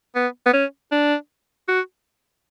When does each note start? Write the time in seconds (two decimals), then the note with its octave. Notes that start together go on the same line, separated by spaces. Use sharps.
0.15 B3
0.46 B3
0.53 C#4
0.92 D4
1.69 F#4